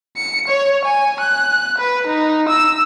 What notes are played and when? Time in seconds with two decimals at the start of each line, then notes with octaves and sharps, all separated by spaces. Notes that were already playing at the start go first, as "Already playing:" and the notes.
0.17 C#7
0.48 C#5
0.85 G#5
1.20 F#6
1.78 B4
2.07 D#4
2.49 E6